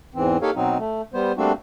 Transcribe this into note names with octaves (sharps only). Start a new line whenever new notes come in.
E2 G#2 E3 C4
A#3 D#4 G4 A4 C#5 F5
B2 F#3 C4 D#4
A3
G3 B3 C5
G3 A3 A#3 C4 D4 F#4